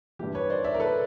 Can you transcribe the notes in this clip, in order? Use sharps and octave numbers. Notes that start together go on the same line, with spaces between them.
G2 E3 G4
B4 C#5
C5 D5
D5 E5
A#4
A4 B4